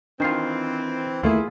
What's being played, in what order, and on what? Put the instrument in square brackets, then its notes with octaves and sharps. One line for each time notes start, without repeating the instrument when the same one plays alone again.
[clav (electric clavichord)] D#3 F4 [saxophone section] E3 C4 [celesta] D4 C7
[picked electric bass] D#2 A3 A#3 [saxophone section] E4 [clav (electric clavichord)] F4 G#4